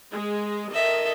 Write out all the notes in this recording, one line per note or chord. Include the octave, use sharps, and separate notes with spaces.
G#3 G#4
D#3 A4 D#5 E5